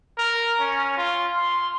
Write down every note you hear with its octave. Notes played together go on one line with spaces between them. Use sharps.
A#4
C#4
F4
C6